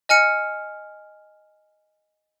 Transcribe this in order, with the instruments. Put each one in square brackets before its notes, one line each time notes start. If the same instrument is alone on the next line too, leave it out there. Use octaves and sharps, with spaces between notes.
[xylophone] D#5 G#5 F6 C#7